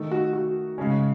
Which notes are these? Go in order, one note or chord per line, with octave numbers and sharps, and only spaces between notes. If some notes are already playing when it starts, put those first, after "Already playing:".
Already playing: D#3 A3 D#4
F#4
F#4
C#3 G#3 C#4